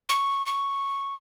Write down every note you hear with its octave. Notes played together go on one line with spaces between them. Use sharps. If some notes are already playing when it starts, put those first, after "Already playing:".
C#6
C#6